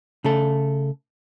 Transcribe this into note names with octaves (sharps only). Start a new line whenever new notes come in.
C#3 A3 A4